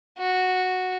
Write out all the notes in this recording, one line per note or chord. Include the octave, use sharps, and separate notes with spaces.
F#4